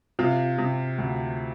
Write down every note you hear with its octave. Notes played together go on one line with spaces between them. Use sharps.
C3 F4
C3
D2